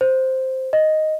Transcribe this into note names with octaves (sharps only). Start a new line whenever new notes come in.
C5
D#5